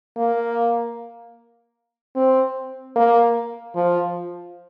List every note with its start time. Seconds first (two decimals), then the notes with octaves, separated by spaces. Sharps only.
0.17 A#3
2.16 C4
2.96 A#3
3.75 F3